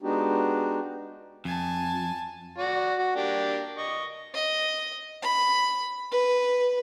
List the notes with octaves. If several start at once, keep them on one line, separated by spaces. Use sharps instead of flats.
G#3 B3 D4 D#4 F#4 G4
F2 G#5 A5
F#4 D5
F#4
A#3 D4 G4
D#5 C#6
D#5
B5
B4